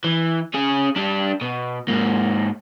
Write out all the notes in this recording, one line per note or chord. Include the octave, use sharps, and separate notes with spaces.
E3
C#4 G#4
G3 D4
B2
G#2 A#3